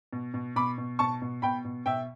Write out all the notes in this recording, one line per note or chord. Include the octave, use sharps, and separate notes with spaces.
B2
B2
B2 B5 D6
B2
B2 A5 C#6
B2
B2 G5 B5
B2
B2 E5 G5